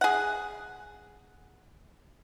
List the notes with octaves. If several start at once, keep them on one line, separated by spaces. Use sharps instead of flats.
G#4 F#5